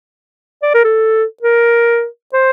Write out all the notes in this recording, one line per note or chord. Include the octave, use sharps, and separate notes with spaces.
D5
A#4
A4
A#4
C5